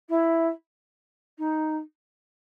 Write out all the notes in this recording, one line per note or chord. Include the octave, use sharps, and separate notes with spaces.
E4
D#4